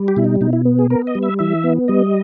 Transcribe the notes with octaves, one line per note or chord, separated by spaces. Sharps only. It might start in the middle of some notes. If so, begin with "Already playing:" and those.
Already playing: G3
G4
B2 E4
D#4
B2 D#4
E4
B3
G#4
B3 A#4
D#5
G3
E5
E3 E5
B3
G3 D#5